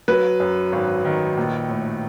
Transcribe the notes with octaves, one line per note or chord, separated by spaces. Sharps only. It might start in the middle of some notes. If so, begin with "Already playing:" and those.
F#3 B4
F#2
G#1
D#3
A#1
A2